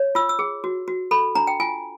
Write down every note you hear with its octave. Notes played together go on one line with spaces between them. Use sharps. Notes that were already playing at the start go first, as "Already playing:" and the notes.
Already playing: C#5
F4 E6
E6
G#4
F#4
F#4
A4 B5
D4 A#5
G5
F4 G#5